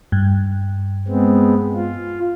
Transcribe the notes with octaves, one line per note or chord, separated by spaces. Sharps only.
G2
G#3 B3 C4
F4